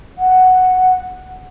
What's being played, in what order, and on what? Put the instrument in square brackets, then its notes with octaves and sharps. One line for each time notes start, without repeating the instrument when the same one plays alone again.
[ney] F#5